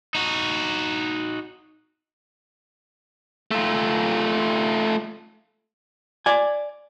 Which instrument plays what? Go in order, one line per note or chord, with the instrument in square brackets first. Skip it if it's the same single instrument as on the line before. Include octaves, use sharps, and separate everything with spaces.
[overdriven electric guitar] D#4 F#4
[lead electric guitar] A3 F4
[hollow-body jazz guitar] D5 G#5